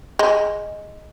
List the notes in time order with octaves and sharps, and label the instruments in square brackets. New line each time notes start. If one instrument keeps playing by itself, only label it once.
[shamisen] G#3